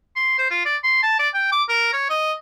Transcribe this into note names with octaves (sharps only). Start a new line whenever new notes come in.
C6
C5
F4
D5
C6
A5
D5
G5
D6
A#4
C#5
D#5